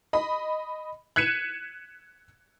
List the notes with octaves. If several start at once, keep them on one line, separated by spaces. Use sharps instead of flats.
D#5 B5
F#6 G#6 B6 C#7 D#7 E7